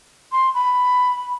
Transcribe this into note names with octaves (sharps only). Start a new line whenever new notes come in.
C6
B5